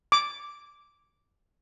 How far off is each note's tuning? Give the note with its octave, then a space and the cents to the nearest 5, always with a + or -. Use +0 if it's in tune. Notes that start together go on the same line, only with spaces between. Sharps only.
D6 -5